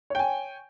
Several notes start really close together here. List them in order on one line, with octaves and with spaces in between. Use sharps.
C#5 G5 G#5